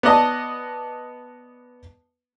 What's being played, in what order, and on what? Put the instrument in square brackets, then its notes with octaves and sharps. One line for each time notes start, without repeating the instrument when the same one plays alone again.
[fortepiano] B3 D5 D#5 A5